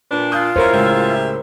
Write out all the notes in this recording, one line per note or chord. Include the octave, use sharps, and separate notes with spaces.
A#2 D4 B4
F4 D#6 F#6 G6
F#3 C#4 E4 A#4 C5 C#5
C#2 A2 C#3 G4 G#4 E5